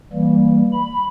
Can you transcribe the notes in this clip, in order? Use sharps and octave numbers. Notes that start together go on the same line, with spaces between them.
E3 G3 A#3
B5